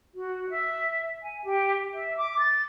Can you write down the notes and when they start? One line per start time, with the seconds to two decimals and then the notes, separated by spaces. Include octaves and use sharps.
0.14 F#4
0.50 E5
1.23 G#5
1.44 G4
1.94 E5
2.17 D6
2.39 A6